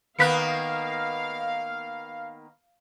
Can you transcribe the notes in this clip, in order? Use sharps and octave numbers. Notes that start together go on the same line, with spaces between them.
D#3 A#3 B3 F5 F#6 B6 C#7